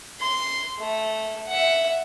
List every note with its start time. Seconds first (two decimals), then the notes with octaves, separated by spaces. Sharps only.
0.20 C6
0.79 A3
1.48 E5 F#5